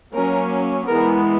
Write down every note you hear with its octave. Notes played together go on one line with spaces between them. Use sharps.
F#3 A#3 C#4 A#4
E3 G#3 B3 A#4